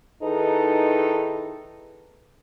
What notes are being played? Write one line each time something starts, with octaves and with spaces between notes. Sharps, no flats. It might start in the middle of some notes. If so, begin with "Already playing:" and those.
D#3 D#4 E4 G#4 A4 B4